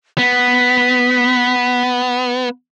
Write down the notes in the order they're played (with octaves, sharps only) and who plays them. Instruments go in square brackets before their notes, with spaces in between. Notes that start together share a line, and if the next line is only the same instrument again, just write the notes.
[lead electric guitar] B3 [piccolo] B6